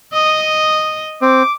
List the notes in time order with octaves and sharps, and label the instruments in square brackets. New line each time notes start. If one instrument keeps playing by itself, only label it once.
[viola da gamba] D#5 [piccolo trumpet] D#6
[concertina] C4 [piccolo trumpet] D6